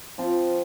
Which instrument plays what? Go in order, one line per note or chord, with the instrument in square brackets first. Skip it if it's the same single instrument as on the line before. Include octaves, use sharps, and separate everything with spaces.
[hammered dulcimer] F3 C4 F4